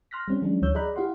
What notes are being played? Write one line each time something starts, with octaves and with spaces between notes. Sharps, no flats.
C6 F6 F#6 A#6 B6
G3 C4 C#4
E3 F#3 G#3 C#4 D4
D2 E3 F#3 C#5 E6 G6
G#4 D5 D#5 A#5 B5 F#6
E4 G4 F5 F#5 C6